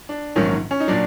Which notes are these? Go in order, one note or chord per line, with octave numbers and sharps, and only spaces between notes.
D4
A#1 G#2 D#3 F#3 C#4
C#4
D#4
A#2 F#3 D4